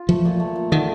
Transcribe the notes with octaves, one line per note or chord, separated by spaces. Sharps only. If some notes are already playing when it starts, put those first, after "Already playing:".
Already playing: F4
F3 A3
A#2
A3
A#2
D3 D#3